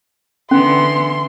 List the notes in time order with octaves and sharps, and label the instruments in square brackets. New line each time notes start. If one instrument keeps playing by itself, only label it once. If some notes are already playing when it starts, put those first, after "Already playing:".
[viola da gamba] D3 E3 B3 [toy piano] C#4 [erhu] C6